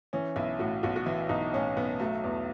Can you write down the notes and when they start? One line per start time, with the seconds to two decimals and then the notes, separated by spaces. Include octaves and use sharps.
0.13 E3 C#4
0.36 B1 E4
0.59 A2 F#4
0.83 B1 F#4
0.96 F#4
1.06 E3 E4
1.29 B1 D#4
1.54 A2 C#4
1.77 B1 B3
2.00 F#3 A3
2.24 E2